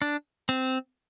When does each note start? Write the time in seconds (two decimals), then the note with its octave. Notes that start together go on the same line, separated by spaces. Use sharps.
0.02 D4
0.49 C4